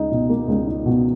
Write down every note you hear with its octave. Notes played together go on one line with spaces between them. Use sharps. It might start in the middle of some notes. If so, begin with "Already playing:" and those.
Already playing: C#2 D#4
B2
A#3
C#2
D#4
B2